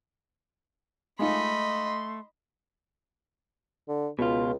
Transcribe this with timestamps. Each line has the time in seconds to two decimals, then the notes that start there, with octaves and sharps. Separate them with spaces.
1.19 G#3 A3 D#4 F4 D#5 B5 C6
3.88 D3
4.19 C#2 B2 F4